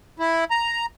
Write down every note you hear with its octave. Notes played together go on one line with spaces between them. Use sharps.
E4
A#5